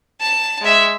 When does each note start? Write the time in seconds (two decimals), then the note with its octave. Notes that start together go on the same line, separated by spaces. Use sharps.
0.20 A5
0.61 G#3 E5